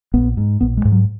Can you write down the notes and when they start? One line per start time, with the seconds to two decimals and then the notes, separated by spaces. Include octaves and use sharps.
0.14 A#1 B3
0.37 G#2
0.61 A#1 B3
0.77 G#3
0.85 G#2
0.92 F#3